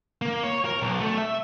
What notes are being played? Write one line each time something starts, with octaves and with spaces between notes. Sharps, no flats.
A#3
C#5
A#4
B1
A3
E5